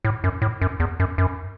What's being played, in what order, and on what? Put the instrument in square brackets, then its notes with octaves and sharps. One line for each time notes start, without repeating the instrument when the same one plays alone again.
[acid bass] A2
F#2
A2
F#2
E2
F#2
F#2